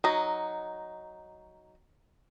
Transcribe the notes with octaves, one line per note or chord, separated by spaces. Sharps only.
F#3 D#4